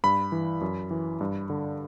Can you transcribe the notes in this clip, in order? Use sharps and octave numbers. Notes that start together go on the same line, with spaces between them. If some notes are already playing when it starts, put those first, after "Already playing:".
G2 B5
E3
F#2
E3
G2
D3